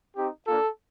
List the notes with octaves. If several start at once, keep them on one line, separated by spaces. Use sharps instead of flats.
C4 D#4 G4
A#3 D4 F4 A4